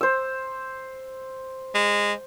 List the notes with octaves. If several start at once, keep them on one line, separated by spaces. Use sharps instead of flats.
C5 E6
G#3